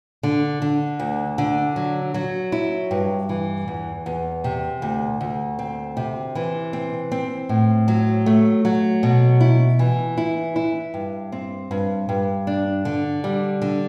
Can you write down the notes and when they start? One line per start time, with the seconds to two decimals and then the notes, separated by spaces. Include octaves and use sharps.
0.23 D3
0.62 D3
1.00 D2
1.38 D3
1.76 F#3
2.14 F#3
2.52 E4
2.91 G2
3.29 E3
3.68 E2
4.06 E2
4.44 C3
4.82 D2
5.21 D2
5.59 C4
5.97 C3
6.35 E3
6.73 C4
7.12 C4
7.49 A2
7.88 F#3
8.26 A3
8.65 F#3
9.03 B2
9.41 E4
9.79 E3
10.17 E4
10.56 E4
10.94 G2
11.32 C4
11.71 G2
12.09 G2
12.47 D4
12.85 D3
13.24 G3
13.62 D3